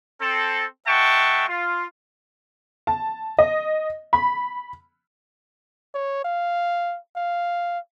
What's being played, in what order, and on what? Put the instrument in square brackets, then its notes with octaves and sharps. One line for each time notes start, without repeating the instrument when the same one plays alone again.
[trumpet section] C4 A4
G#3 E5 F#5 G5 A5 C#6
F4
[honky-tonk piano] A5
D#5
B5
[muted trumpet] C#5
F5
F5